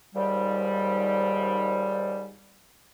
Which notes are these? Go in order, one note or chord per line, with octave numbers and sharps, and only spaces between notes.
D#2 G#2 F3 G3